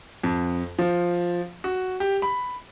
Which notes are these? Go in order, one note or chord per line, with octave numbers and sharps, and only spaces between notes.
F2
F3
F#4
G4
B5